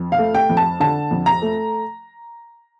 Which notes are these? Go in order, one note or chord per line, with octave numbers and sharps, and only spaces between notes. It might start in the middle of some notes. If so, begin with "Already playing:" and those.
Already playing: F2
F5
A3
G5
F2
A5
D3 A5
F2
A#5
A3